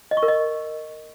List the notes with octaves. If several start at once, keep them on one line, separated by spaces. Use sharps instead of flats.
D#5
C#6
A#4
D#5